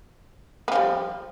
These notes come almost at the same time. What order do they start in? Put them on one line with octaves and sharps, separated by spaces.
B3 F3 G3